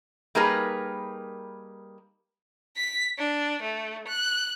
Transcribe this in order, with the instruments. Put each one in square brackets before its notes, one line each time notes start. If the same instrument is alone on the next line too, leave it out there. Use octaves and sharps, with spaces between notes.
[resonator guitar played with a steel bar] G3 A#3 D#4 G#4 A#4 B4
[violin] B6
D4
A3
F#6